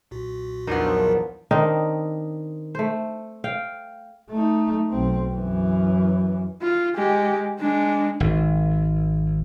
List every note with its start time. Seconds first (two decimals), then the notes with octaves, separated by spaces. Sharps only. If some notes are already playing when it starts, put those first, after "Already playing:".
0.11 B1 A#2 F#4
0.67 E2 F3 F#3 B3 D4 D#4 A#4
1.51 D#3 C4 D4 D#4
2.75 A3 C5
3.44 F5 G5
4.30 A3 D#4
4.91 B1 C4
5.34 F#2 E3
6.62 F4
6.95 G#3 G4
7.60 G#3 D4
8.20 G#1